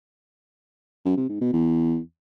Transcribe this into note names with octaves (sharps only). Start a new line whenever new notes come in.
F#2
C3
G#2
B2
E2